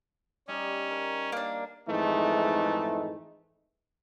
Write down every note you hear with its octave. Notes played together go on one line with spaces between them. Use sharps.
G3 C#4 D#4
A#4
A#3 D4
F2 G#2 E3 G#3 A3 D#4